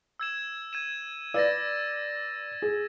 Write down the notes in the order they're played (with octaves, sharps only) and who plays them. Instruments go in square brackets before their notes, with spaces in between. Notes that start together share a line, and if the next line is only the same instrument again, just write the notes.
[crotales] E6 G#6 E7
G#6 D#7 E7
[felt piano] B4 D5 [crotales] E6 A6 A#6
[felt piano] G#4